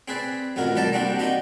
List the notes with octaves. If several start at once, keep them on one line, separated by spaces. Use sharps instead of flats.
C4 G#4 B4 D5
A1 F2 B2 F#4 A#4
C2 G3 G4 D5 A5 A#5
G3 A#3 C4 D4 F#4 G4
D#4 F#4 G4 D#5